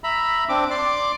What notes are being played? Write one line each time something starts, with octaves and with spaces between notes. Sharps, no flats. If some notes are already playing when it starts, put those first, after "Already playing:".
E5 A#5 B5
C4 D4 D6
D5 C6 D6